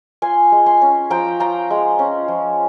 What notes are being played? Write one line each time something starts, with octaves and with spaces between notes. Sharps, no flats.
F4 G#5 C6
G#3
G#5 C6
C#4
F3 G5 A#5
F4 G5 A#5
G#3
C#4
F3